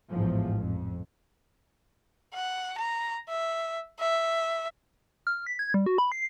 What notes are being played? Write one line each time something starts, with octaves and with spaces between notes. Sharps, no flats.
A1 E2 G#2 F3
F2
F#5
A#5
E5
E5
F6
B6
G#6
G3
F#4
B5
C7